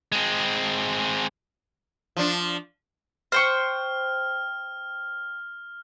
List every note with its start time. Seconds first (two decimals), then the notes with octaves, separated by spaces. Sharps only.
0.12 G#3 C4
2.17 F3 D4
3.32 C5 G5 C#6 F6